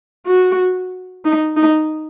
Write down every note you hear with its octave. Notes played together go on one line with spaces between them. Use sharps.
F#4
D#4
D#4